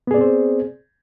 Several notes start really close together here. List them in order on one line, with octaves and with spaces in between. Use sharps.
B3 G#4 D5 C4 C5